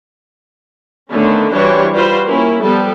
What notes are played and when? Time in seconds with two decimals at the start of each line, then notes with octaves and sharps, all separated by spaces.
1.11 D3 D#3 A3 B3 C#4
1.54 E3 G3 D4 F#4 C5 C#5
1.93 G3 F4 F#4 B4 C5
2.26 A#3 C#4 E4
2.63 F3 G3 B3 A4